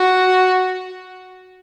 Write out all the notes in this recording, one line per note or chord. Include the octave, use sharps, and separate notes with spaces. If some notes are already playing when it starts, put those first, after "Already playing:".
Already playing: F#4